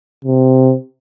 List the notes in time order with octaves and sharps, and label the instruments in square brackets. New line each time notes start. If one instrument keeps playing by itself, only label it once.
[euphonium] C3